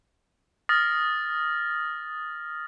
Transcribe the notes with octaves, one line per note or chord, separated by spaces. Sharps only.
D#6 F6 A6 A#6